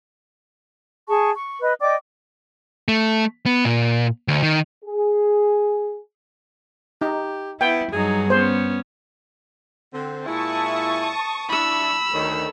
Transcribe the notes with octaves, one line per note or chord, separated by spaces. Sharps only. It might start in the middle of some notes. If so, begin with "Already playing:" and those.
G#4 A5 C#6
C#6
B4 D#5
D5 D#5 G5 D6
A3
B3
A#2
D2
D#3
G#4
D#4 G4
B3 E4 G5
G2 F#3 D#4 G#4
B3 C#4 C5
D3 C4
A#2 G#3 E4 A5 C#6 D#6
D4 E4 B5 E6
D2 D#3 A4 A#4 C#5